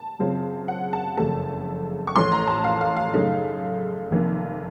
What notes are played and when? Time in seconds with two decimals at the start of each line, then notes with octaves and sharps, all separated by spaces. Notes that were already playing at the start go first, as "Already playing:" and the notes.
Already playing: A5
0.19 F#2 C#3 F#3 C4 F4
0.68 F#5
0.93 A5
1.17 F#1 F2 C#3 A3 A5
2.07 C#6
2.15 A1 A2 F3 A3 C6
2.32 A#5
2.47 A5
2.64 F5
2.81 F5
2.96 F5
3.13 F#2 C#3 A3 D#4
4.11 F1 F2 D#3 A#3